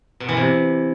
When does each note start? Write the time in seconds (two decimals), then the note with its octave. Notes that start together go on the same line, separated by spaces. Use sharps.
0.20 B2
0.29 E3
0.37 C3